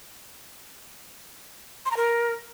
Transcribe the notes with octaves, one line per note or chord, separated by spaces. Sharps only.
C6
A#5
A#4